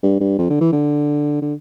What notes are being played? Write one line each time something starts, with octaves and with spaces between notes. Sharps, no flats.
G2
G2
F2
D3
E3
D3
D3